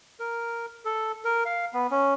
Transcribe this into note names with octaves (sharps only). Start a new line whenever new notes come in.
A#4
A4
A#4
F5
B3
C#4